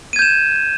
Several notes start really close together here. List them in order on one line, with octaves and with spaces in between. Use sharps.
D#7 G#6 G6 E7